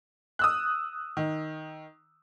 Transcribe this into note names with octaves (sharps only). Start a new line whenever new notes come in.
D#6 E6 F#6
D#3